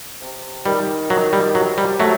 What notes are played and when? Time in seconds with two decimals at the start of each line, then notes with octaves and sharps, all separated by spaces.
0.21 C3
0.66 D#3 G3
1.10 D#3 F#3
1.33 G3
1.55 C3 F#3
1.78 G3
2.00 C3 F#3 A3